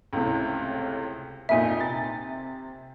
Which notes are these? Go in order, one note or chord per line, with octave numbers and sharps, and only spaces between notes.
C#2 A2 C3
F2 A#2 D#4 E5 G#5
C3 A6